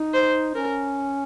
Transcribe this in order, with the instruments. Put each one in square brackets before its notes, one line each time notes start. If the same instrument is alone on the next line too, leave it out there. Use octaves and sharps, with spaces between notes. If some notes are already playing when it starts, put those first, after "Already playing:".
Already playing: [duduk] D#4
[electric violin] C5
[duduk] C#4 [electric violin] A#4